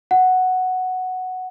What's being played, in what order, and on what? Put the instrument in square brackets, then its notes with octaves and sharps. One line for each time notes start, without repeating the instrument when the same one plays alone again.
[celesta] F#5